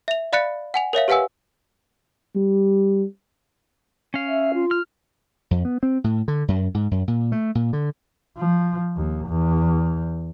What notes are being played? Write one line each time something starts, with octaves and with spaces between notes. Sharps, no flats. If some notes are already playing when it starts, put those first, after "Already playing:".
E5 F7
D5 F5 B5 F#6 A6 C#7
F#5 G#5 F7
A#4 C#5 E5 F5
G4 B4 F5 F#5 G#5 E6
G3
C#4 F5
E5
F4
F6
F2
B3
C4
A2
D3
F#2
G#2
F#2
A#2
A3
A#2
D3
F3
D#2
E2